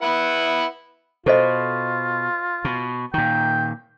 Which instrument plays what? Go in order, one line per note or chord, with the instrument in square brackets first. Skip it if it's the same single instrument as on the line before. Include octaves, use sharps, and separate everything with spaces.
[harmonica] E4 B4 F#5
[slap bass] B2 [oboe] F4 [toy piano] A4 C5 D#5
[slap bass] B2
[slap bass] A#2 D#3 [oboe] G5